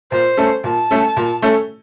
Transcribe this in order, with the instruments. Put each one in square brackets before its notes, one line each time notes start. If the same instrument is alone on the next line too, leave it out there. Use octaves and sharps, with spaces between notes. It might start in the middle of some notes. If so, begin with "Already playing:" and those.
[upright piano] A#2 [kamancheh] C5
[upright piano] A3 C#4 A4
[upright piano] A#2 [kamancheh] A5
[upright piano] A3 C#4 A4
A#2
A3 C#4 A4